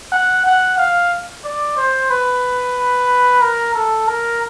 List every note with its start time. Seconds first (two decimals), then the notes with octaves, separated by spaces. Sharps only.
0.12 F#5
0.46 F#5
0.78 F5
1.45 D5
1.77 C5
2.10 B4
3.41 A#4
3.74 A4
4.08 A#4